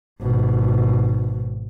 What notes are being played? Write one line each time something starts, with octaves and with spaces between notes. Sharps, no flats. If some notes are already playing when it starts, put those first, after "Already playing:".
G#1 B2